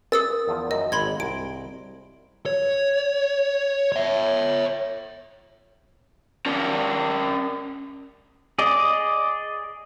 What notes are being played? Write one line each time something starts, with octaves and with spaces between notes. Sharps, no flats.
A#4 D#6 E6 A6
E2 F3
F#2 D#5
G#1 B5 C6 G#6
C2 D7
C#5
C#5 E5
C#4 A#4 D5 A5
G#4 D5 D#5